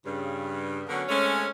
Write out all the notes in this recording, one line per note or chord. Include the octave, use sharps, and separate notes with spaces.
G2 C#3
D3 F#3 B3 C#4 F#4 A#4
G#3 A3 C4 C#4